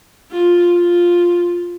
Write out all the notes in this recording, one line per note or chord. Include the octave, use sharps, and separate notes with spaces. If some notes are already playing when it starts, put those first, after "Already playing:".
F4
F4